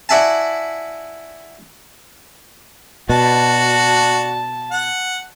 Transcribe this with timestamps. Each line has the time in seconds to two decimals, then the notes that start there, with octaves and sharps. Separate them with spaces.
0.09 E4 F#4 D5 E5 G#5 A5
3.10 B2 D4 F#4 A5
4.71 F#5